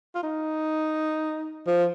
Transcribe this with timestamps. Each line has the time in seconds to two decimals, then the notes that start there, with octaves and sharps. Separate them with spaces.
0.15 F4
0.23 D#4
1.67 F3